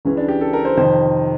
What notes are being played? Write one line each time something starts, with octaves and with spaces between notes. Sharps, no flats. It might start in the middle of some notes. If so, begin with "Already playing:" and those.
C#2 C#3 E3 C#4
D4
G4
A4
A#4
C5
F2 C3 D#3 C5